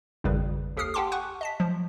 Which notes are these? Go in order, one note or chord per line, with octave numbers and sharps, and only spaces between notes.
G#1 F2 C#3 G3 B4
D#2 G4 A4 D#6 F6 C7
G4 F#5 G5 A5 C6 D6
F#5 G#5 C#6 F#6
D#5 A5 B6
F3 F#3